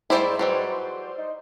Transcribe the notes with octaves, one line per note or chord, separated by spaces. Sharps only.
G#2 G3 A3 E4 C5 D5 C6
E3 F#3 G3
D#4